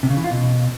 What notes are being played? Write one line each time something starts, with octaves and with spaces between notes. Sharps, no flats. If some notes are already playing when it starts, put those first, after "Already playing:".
C3
C#3
E3
F4
B2